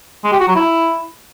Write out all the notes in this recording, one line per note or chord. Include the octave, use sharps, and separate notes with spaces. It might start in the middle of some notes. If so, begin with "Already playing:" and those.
G#3
G4
F#4
F#3
E4